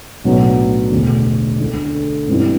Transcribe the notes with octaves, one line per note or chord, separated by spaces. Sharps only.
B1 A2 F#3 B3 D4
E1 D2 D3
D2 D3 A3
G2 E3 G3 C4 E4